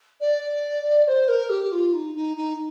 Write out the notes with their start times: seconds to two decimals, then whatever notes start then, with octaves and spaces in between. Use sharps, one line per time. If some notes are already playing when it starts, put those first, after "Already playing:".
0.21 D5
1.08 C5
1.28 A#4
1.50 G4
1.72 F4
1.93 D#4
2.15 D#4
2.37 D#4